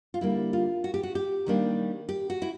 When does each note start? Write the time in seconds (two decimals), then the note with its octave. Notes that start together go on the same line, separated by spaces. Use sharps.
0.14 F4
0.21 D3 G3 A#3 E4
0.53 F4
0.84 F#4
0.94 G4
1.03 F#4
1.15 G4
1.46 D#3 G3 A#3 D4
2.09 G4
2.30 F#4
2.42 E4